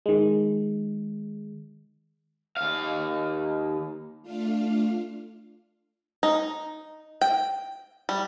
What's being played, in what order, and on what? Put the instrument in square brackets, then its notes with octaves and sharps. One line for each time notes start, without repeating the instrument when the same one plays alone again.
[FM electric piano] D#3 G#3
[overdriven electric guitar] D#2 F5
[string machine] A3 D4 F4 F5
[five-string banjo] D#4
G5
G3